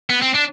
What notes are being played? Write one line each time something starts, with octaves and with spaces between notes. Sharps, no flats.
B3
C4
D4